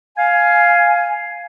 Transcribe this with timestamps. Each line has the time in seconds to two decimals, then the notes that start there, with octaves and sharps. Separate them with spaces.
0.18 F5 G#5